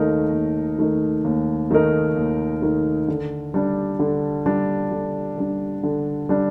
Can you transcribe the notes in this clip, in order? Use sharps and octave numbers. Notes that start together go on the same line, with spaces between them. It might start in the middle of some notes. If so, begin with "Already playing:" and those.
Already playing: D#2 D#3 A3 D#4 A#4
D#2
D#3 A3 D#4 A#4
D#2
D#3 A3 D#4 A#4
D#2
D#3 A3 D#4 A#4
D3
G3 D4
D3
G3 D4
D3
G3 D4
D3
G3 D4